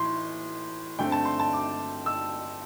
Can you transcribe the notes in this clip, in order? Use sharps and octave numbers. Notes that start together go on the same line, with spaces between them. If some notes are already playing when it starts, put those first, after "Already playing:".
Already playing: A2 E3 C6
G2 D3 A3 C4 G5
A5
C6
A5
D6
E6